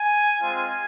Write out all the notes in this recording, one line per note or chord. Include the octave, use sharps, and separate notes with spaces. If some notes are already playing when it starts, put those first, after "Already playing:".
Already playing: G#5
G#3 C4 F4